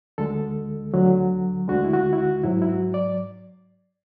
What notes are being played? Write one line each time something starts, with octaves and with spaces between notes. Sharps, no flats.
D2 D3 G#3 A4
D2 D3 F#3
D2 D3 G#3 F#4
E4
F#4
E4
F#4
G#2 F#3 E4
E4
F#4
D5